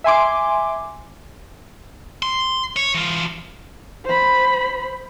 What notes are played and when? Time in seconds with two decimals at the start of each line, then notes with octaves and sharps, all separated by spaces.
0.04 E5 G#5 C6 D6
2.23 C6
2.76 C#5
2.95 E3 F4
4.05 C5 B5